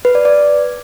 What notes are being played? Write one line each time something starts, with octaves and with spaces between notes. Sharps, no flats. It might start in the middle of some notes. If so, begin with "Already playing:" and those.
B4
D5
D5